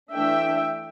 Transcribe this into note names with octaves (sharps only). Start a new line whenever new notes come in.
E3 A3 D4 E5 G5